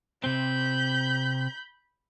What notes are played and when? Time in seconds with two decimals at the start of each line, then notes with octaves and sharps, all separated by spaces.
0.24 C3 C4 B5 G6